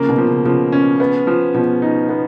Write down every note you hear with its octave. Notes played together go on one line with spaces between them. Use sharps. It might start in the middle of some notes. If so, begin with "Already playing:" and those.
Already playing: C#3 F3 A#3 C#4
B2
F3
C#3
C#3 F3
C#4
B3
F3
B2 F3
D#4
B3